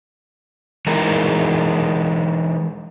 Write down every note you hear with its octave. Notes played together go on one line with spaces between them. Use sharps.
E3 G#3 D#4 A#4